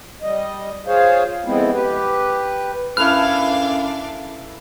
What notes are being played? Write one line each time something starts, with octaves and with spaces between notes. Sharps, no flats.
G3 D#5
F4 G#4 C5 C#5 F5
F2 G#3 B3 C4 E4
G4 B4
F#2 D4 E4 A4 B4 F5 F6